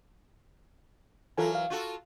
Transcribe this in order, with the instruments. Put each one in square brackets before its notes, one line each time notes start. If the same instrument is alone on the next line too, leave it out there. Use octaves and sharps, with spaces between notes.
[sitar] E3 F#3 A#4 [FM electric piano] F4 A4 G#5
[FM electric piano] F5
[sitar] F4 F#4 A4